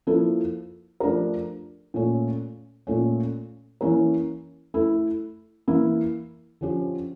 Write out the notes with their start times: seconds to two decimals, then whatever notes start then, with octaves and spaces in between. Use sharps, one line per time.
0.07 F3 A#3 E4 A4
1.00 F3 A3 D4 G4 A#4
1.94 A#2 A3 C#4
2.87 A#2 A3 C#4
3.81 E3 A#3 C#4 E4 A#4
4.74 A3 E4 A4
5.68 E3 A#3 E4
6.61 D3 F3 C#4 G4